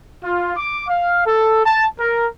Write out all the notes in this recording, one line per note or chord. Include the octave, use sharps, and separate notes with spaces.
F4
D6
F5
A4
A5
A#4